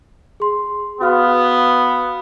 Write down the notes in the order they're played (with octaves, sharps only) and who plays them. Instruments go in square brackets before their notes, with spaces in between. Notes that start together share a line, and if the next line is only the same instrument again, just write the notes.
[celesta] G#4 C6
[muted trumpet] B3 [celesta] F#4 F5 F6